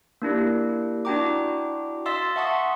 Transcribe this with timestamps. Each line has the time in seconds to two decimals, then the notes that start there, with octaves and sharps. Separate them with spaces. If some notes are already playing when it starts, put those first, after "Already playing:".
0.22 A#3 D4 E4 G4
1.05 D4 E4 F#4 G5 A#5 D6
2.06 D#5 F5 C6 E6 A6 B6
2.36 E5 F#5 A5 C6 C#6 D#6